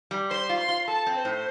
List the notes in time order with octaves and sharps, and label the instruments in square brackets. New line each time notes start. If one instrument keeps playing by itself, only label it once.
[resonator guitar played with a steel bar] G3
[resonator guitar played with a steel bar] C5 [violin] C6
[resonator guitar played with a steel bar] F4
[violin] C6
[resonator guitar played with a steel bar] F4
[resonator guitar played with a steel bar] A4 [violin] A5
[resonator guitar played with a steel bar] C4
[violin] C5
[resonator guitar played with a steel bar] A2